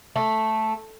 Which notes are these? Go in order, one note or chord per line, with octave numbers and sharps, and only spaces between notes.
A3